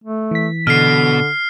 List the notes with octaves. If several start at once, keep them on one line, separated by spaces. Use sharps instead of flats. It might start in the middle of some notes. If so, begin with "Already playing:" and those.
A3
E3 B6
B2 D3 F6 C7